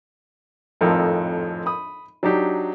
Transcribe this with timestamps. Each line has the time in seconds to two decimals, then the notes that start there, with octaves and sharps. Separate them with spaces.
0.81 G#1 F2 A2 F3 A4 A#4
1.66 B5 D#6
2.23 F#3 D4 D#4 G4